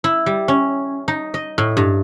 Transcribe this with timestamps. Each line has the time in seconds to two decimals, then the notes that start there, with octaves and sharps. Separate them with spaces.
0.04 E4
0.26 G3
0.48 C#4
1.08 D#4
1.34 D#5
1.58 A2
1.77 G2